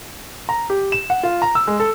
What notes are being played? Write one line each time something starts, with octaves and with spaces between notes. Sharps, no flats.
A#5
G4
E7
F#5
F4
A#5
E6
G#3
A4